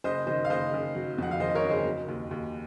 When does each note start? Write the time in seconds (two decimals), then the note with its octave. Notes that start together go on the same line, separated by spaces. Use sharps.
0.04 F#1 C5 D#5
0.27 D#3 C5 D#5
0.45 F5
0.50 F#1 C5 D#5
0.73 F#1
0.95 F#3
1.18 F2 F#5
1.31 F5
1.40 D#3 C5 D#5
1.55 A#4 C#5
1.64 F#1
1.70 G#4 C5
1.85 F#3
2.08 D#2
2.31 D#2